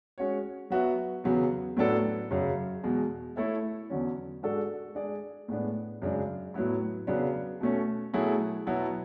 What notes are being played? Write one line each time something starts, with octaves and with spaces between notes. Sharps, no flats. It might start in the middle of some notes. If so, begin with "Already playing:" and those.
G#3 C#4 F#4 C#5
F#3 B3 F#4 B4 E5
E2 C#3 F#3 B3
A2 F#3 B3 D4 A4
F#2 C#3 F#3
E2 B2 G#3
A3 E4 A4 C#5 E5
E2 D3 F#3 C#4
G#2 G#3 D4 F#4 A4
G#3 D4 G#4 D5
A2 G#3 B3 D4
F#2 C#3 G#3 D4
A2 F#3 B3 E4
C#3 F#3 B3 D4
B2 A3 C#4
B2 F#3 A3 E4 G#4
B2 F#3 B3 E4